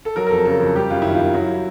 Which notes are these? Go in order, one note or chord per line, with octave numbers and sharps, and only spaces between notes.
A4
F#3 A#4
A#4
F2 A4
C#3 A4
F2
G3 G4
F#2 F4
D#3 E4
F4
F#2
F#3 E4